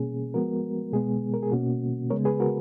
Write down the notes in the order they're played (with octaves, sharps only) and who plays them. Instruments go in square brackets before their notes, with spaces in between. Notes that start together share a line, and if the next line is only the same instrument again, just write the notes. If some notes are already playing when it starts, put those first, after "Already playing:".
Already playing: [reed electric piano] B2 A#3 C#4 G#4
F3 G#3 B3 F#4 A#4
B2 G#3 B3 G#4
A#4
G#4
B2 A#3 C#4 F#4
C#3 G#3 B3 A#4 C#5
G#4 B4
F#4 A#4